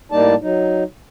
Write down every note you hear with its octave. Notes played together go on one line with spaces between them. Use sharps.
A2 G3 A#3 D#4 D5 A5
F#3 D#4